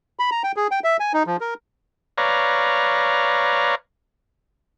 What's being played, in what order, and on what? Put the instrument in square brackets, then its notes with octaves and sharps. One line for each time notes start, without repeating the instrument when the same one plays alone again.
[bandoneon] B5
A#5
G5
G#4
G5
E5
G#5
D#4
F3
A#4
[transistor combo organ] B4 C#5 D5 F5 A#5